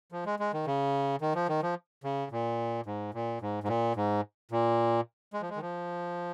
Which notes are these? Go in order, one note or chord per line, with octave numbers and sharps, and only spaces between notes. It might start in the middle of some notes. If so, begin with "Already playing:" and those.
F3
G#3
G#3
D#3
C#3
D#3
F3
D#3
F3
C#3
A#2
G#2
A#2
G#2
G#2
A#2
G#2
A#2
G#3
F3
G#3
D#3
F3